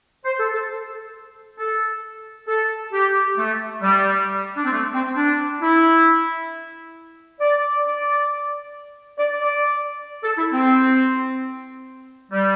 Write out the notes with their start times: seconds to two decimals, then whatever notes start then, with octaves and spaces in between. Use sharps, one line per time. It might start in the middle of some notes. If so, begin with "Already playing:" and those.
0.25 C5
0.39 A4
0.54 A4
1.59 A4
2.48 A4
2.93 G4
3.38 A3
3.83 G3
4.57 D4
4.65 C4
4.72 A3
4.94 C4
5.17 D4
5.62 E4
7.41 D5
7.85 D5
9.19 D5
9.41 D5
10.23 A4
10.38 E4
10.53 C4
12.32 G3